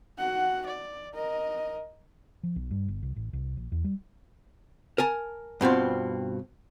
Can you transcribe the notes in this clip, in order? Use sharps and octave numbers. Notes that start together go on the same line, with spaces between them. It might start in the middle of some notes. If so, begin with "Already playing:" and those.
F#4 F#5
D5
A#4 D#5
F3
B1
G2
G1
C2
A1
C2
A#1
E2
G3
A#4 G#5 A5
G2 B2 C4 F4